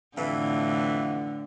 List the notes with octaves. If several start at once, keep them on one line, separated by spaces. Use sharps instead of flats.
F2 A2 D3 E3